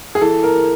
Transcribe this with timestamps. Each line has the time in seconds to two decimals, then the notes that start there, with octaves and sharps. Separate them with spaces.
0.15 G#4
0.21 E3 A4
0.43 A#4